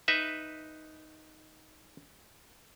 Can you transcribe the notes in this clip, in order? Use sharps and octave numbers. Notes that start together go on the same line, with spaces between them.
D#4 B4 E5